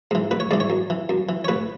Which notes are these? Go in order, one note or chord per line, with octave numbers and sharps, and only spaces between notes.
G#2 E3
A1 B4
C#5
G#2 E3 D5
C#5
F#2
E3
F#2
E3
C#5
A1 B4